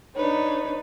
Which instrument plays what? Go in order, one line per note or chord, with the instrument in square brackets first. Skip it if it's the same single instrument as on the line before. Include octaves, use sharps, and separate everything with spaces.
[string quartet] D4 D#4 B4 C#5